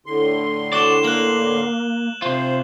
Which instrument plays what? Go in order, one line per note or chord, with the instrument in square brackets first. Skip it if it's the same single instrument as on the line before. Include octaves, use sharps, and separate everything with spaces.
[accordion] A2 D3 C6
[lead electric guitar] F#4 D5 [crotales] E7 G7
[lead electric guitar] A#3 [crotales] F#6 F#7
[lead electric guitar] C3 F4 [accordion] C5